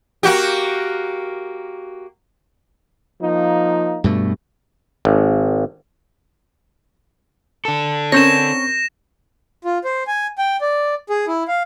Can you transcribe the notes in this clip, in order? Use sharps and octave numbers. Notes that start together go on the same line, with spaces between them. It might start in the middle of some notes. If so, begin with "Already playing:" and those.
A#3 F#4 G4
F3 A#3 D#4
G2 B2 A3
G#1
D4 A4
C4 C#4 A#4 C#5 G6 A#6 E7
F4
C5
G#5
G5
D5
G#4
E4
F5